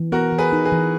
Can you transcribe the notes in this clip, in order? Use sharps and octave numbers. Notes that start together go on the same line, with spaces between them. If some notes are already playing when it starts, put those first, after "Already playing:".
Already playing: E3
B3 F#4 A#4
E3
G#4 B4
D#4
G#4 B4
E3